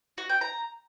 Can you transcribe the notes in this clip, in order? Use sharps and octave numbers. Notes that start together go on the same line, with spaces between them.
F#4
G5
A#5